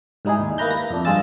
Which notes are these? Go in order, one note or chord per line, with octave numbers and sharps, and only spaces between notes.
G#2 G3 D#4 E4 G#4
D#2
A#3 E4 B4 A#5 G6
A#6
F2 D4
G2 G#3 F4 G#4 E6 A6